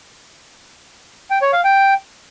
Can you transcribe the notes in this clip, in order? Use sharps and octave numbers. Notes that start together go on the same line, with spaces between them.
G5
C#5
F5
G5